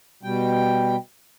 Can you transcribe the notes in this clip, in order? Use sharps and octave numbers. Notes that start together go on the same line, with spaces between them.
B2 G3 G5